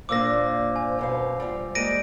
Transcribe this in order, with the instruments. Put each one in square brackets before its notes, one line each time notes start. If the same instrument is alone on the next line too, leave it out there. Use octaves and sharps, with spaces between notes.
[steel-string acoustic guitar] A#2 A#3 D4 [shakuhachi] C5 [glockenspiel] D6 E6 A#6
[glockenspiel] G#5
[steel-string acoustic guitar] F#2 B2 F5
G3 F4
[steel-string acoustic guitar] G3 G#3 A#3 [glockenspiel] A#6 D7 D#7